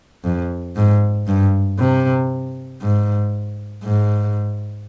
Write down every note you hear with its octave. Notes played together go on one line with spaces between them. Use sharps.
F2
G#2
G2
C3
G#2
G#2